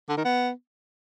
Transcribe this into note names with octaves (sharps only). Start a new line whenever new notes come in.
D3
D#3
B3